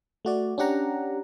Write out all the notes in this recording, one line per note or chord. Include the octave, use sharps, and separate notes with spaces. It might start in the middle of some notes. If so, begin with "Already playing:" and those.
A3 F#4 D5
C#4 D4 G4 F#5 A#5